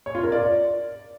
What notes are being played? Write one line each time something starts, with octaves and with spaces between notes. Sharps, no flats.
C#5
F4
A#4
D5